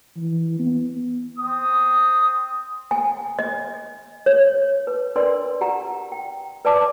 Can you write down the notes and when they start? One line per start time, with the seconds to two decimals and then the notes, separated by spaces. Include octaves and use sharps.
0.17 E3
0.59 B3
1.38 C4 D#6
2.91 G#5
3.39 D#5
4.26 C#5
4.87 B4
5.16 D4 A#4 B4 D5 C6
5.61 G4 F#5 A#5
6.12 G5
6.65 B4 D5 E5 A5 D6